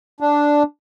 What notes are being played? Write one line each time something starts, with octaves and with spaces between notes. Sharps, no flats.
D4